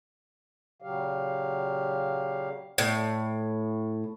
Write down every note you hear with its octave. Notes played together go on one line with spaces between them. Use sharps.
A#2 C#3 F#3 G4 F5
A2